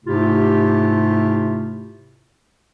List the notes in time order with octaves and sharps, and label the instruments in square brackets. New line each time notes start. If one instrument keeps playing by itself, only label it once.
[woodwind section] G#2 C3 A3 E4 F4 G4